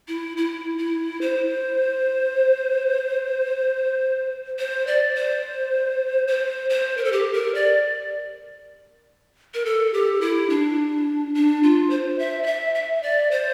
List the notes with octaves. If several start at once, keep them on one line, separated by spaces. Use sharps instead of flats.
E4
E4
E4
C5
C5
D5
C5
C5
C5
A#4
A4
G4
A#4
D5
A#4
A4
G4
E4
D4
D4
F4
C5
E5
D5
E5
E5
D5
C5